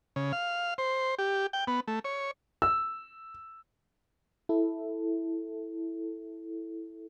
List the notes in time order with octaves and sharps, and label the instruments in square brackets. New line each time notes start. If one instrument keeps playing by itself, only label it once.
[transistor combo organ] C#3
F5
C5
G4
G5
B3
A3
C#5
[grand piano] E6
[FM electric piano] E4 A4